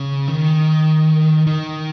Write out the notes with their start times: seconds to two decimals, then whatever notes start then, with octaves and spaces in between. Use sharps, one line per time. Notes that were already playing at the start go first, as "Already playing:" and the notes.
Already playing: C#3
0.28 D#3
1.47 D#3